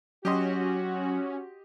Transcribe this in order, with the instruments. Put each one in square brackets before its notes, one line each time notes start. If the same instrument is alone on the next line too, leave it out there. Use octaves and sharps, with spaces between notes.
[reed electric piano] F#3 [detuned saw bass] C#4 [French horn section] F#4 [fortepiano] G4 D#5 C6